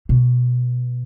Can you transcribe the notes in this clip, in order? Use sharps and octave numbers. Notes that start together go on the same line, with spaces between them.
B2